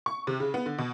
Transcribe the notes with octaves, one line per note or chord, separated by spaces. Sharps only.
C#6
C3
C#3
B3
D3
B2